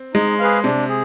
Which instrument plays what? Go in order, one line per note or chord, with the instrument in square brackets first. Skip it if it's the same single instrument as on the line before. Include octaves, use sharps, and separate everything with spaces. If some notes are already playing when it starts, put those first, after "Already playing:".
Already playing: [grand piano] C4
[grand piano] G#3 [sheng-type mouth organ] D#4
[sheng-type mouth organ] G#4 B4 F5
[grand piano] C3 [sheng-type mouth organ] D4
[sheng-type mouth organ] G#4